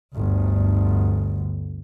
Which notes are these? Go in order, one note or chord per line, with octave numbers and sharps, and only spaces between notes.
G1 D2